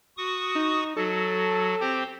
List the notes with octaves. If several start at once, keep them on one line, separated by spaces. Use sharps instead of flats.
F#4 C#6 D#6
D#4
F#3 F#4 A4
C4 G4 C5